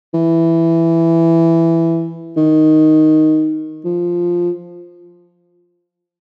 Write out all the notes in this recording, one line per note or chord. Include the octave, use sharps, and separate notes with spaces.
E3
D#3
F3